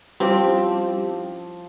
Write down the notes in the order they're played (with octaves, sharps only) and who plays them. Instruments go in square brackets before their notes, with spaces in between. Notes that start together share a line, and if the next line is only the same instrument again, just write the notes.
[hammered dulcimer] F3 [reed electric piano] G3 C#4 E4 [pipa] C4 [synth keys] G4